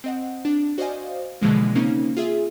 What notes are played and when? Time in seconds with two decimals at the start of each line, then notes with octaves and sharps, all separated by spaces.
0.04 C4 D#5 F#5
0.45 D4
0.78 F#4 C5 D5 D#5 F5 G#5
1.41 B2 D3 E3 F3 G#3 A#3
1.75 C#3 A#3 C4 C#4 D#4
2.17 F4 G#4 E5